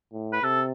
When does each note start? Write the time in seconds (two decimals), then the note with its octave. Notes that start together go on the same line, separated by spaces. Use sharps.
0.13 A2
0.33 B4
0.43 C3 A4